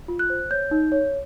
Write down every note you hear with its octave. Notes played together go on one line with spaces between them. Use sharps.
F4
F#6
C5
C#5 G6
D#4
C#5